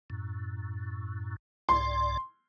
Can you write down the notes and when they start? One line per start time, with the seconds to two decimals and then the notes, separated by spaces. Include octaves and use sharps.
0.10 F#2 A2
1.69 C2 G#2 D5 C6